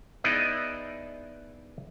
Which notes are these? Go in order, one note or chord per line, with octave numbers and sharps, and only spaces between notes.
B3 D#4 E4 G#4 D5 D#5